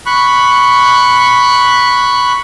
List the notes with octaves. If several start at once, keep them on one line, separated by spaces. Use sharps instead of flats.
B5 C#6 F#6